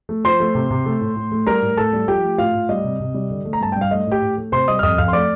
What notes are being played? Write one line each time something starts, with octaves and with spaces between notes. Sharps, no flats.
A3
F3 C5 C6
A3
C3
C3
A3
A2
A2
A3
G3 A#4 A#5
A2
A2 A4 A5
G3
F3 G4 G5
A3
A2 F4 F5
A2
G3 D#5
C3
C3
G3
D3
A3
A#5
G2 A5
G2 G5
F5
A3 D#5
A2 G4 G5
A2
A3
C3 C5 C6
G3 D#5 D#6
F6
F2 D#5 D#6
F2 F5 F6
C6
A3 D5 D6